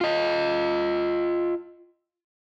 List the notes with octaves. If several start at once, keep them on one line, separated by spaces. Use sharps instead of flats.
F4 D#5